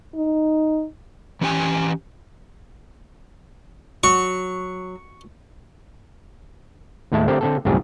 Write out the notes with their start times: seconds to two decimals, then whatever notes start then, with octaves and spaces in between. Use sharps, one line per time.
0.15 D#4
1.41 E3 C#4 G4 G#5
4.04 F#3 C#6
7.12 D#2 A2 G#3 A3 E4 A5
7.28 D3 A3 C4 G4 A#4 C5
7.41 D3 C4 A4
7.65 C2 F#2 A2 G4 G#4